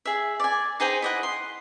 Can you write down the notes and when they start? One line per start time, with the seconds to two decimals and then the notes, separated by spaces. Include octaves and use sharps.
0.05 G#4 E5
0.40 D5 G#5
0.80 D#4 G#4 C5 G5
1.02 E4 D#5 F#5
1.23 C6